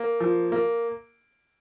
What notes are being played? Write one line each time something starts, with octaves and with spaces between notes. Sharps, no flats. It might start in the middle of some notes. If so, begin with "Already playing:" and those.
Already playing: A#3
F3
A#3